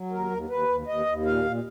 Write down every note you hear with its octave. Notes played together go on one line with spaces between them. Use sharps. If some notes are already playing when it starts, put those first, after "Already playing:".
Already playing: F#3
D#2 A#4
D#2
D#2 B4
D#2
D#2 D#5
D#2
A#2 F5
A#2